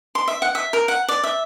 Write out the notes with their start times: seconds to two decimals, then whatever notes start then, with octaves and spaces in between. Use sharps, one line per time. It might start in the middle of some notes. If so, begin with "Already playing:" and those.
0.15 C6
0.28 E5
0.42 F#5
0.55 E5
0.73 A#4
0.88 F#5
1.09 D5
1.24 E5